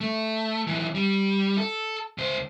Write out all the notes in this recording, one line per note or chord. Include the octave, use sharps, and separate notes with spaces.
A3
F#2 E3
G3
A4
C#2 C5